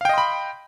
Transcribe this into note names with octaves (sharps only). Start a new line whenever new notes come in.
D#5 F5 G5 B5 C6